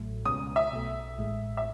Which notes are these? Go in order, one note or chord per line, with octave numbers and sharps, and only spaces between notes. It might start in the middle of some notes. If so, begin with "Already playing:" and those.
Already playing: A1 A2 F#3 A3
C#2 B2 G#3 C#4 D#6
E5
B1 B2 A3
A1 A2 G#3
E5